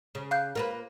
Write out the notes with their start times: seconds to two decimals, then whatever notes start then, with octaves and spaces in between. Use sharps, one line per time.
0.15 C#3
0.31 F5 F#6 G6
0.55 A#3 F4 B4